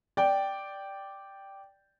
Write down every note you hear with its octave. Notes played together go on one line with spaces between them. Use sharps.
D5 G5